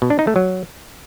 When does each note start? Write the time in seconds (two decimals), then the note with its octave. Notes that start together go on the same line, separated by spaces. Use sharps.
0.02 B2
0.10 D4
0.19 D#4
0.27 A3
0.36 F#3